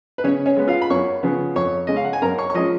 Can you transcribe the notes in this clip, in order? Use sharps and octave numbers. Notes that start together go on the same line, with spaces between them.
B4
C#3 C#4 C#5
C#4 C#5
G#3 B3
F4 F5
B5
F#2 C#5 C#6
C#3 F3 B3
F2 C#5 C#6
C#3 G#3 C#4 D#5
F5
F#5
G#5
F#2 A#4 A#5
C#5 C#6
C#6
F3 G#3 C#4 D#5 D#6